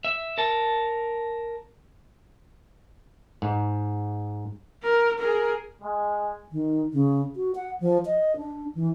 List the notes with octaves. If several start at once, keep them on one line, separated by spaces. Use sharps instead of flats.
E5
A#4 A5
G#2
A#4
G#4 A#4
G#3
D#3
C#3
F#4
F#5
F3
D#5
D4
E3